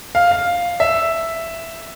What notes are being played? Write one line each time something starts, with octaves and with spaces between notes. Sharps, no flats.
F5
F5
E5